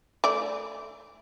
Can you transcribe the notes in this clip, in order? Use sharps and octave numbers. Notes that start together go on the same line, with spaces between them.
A3 D5